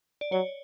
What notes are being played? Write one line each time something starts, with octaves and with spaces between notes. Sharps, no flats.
D5
F#3 C#5